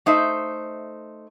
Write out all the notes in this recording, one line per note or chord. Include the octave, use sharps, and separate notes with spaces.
A3 D#4 C5 E5